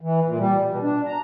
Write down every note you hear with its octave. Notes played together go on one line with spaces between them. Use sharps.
E3
A#2
G3
B2
D4
A#5